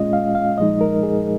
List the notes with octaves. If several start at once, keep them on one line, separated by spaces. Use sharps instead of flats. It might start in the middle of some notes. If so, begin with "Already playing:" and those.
Already playing: A#2 G#3 C#4 F4 D#5
F5
F5
A#2 F3 G#3 D#4 D#5
A#4
G#4